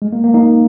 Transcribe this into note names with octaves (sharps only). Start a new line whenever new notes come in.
G#3
A#3
A#3
A#3 D#4